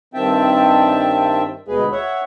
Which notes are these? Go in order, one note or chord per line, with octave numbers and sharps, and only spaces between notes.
G2 D#3 C4 E5 G5 A5
D2 B2 G#3 G#4 B4
C#5 E5 F#5